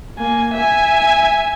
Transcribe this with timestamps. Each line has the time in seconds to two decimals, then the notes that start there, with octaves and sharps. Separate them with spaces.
0.18 A#3 G#5
0.53 E5 G#5